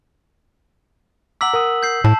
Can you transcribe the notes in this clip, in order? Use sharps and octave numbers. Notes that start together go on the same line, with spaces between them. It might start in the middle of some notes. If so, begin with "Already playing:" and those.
F#5 A#5 D6 E6 B6 F#7
A#4 F#5 D#6
G6 C7
A2 A5